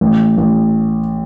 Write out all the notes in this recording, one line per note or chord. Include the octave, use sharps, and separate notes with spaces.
A1
A1